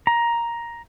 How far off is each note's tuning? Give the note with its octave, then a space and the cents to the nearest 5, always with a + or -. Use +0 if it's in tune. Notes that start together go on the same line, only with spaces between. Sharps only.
A#5 +10